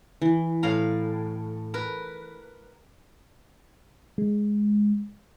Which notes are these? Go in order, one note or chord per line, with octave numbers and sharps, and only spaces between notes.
E3
A2 F5 A#5
A#4 B4
G#3